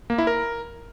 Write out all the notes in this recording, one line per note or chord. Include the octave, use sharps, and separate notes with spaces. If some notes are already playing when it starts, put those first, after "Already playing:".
A#3
E4
A#4